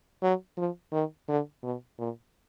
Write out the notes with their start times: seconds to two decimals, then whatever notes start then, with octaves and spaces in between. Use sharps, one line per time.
0.22 F#3
0.58 F3
0.92 D#3
1.28 D3
1.63 B2
1.98 A#2